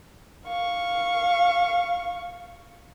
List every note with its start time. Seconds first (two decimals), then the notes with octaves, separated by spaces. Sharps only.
0.46 F5 C#6